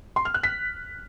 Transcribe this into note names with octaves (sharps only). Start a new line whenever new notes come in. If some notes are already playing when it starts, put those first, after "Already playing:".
C6
F6
F#6
B6